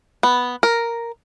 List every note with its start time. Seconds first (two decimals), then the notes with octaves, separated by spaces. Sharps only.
0.23 B3
0.63 A#4